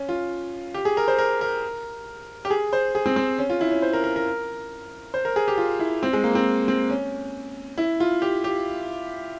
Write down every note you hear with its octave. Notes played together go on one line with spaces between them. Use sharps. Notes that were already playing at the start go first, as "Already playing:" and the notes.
Already playing: C#4
F4
G4
G#4
A#4
C5
A#4
A#4
G4
G#4
C5
G#4
C4
C4
C#4
F4
E4
C#4
C5
A#4
A#4
A#4
C5
A#4
G#4
G4
F4
E4
C4
G#3
A#3
C4
C4
C#4
E4
F4
G4
G4